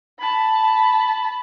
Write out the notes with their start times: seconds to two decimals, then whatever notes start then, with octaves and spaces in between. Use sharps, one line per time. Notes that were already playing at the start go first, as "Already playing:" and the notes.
0.20 A5 B5